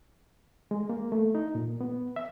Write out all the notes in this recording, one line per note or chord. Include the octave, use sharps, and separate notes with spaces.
G#3
A#3
A3
D#4
A#2
B3
E5